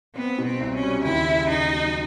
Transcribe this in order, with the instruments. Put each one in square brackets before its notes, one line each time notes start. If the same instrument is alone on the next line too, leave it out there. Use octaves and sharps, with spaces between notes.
[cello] B3 [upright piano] C4
[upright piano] B2
[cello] C4
[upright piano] C2
[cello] C#4
[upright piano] G3
[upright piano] D#2 [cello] E4
[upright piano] C#3
[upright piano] D#2 [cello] D#4
[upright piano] F#3